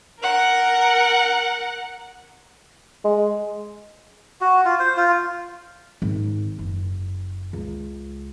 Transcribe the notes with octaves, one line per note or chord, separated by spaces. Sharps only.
A#4 F#5
G#3
F#4
F4
C5
F4
G#1
F#1
C#2